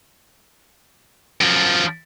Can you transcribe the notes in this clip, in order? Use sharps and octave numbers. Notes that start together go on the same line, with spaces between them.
F#2 F3